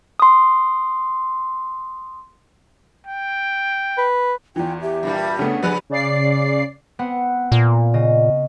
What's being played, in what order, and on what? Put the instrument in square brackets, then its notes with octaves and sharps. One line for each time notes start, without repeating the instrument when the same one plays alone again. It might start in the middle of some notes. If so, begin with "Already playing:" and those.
[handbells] C6 D#6
[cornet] G5
[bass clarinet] B4
[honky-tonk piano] E2 E3 [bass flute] F4 [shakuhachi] G5
[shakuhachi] G4 [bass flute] E5
[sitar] G2 A#2 G3
[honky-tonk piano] C#3 A3 B3 [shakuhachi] D4 [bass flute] F#5
[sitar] F3 B4 [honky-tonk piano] G3 G#4
[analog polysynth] C#3 D5 C7
[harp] B3 C4 F#5
[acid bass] A#2
[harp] C#3 D#5